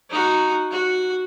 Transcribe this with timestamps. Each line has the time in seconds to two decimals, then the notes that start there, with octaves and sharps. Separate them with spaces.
0.10 D#4 F#4
0.71 F#4